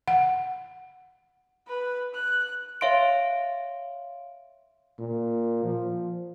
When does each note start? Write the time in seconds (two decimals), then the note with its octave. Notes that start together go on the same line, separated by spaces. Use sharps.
0.08 F#5
1.68 B4
2.14 F#6
2.81 C#5 E5 F5 C6 D7
4.99 A#2
5.64 F3